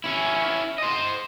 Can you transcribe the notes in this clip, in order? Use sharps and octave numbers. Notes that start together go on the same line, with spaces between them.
C#4 E4
C5 D#5